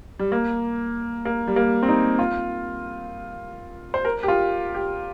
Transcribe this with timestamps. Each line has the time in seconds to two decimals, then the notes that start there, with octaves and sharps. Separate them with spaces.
0.19 G3
0.32 A#3
1.25 A#3
1.48 G3
1.56 A#3
1.83 C4
1.88 D#4
2.19 F4
3.94 C5
4.05 A#4
4.23 G4
4.28 F4
4.75 G4